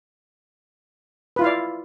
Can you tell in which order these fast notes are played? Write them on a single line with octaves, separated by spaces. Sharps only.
B4 F4 E4 F5 D5